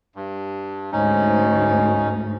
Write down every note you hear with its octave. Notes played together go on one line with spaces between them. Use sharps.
G2
D2 G#2 C#4 D#4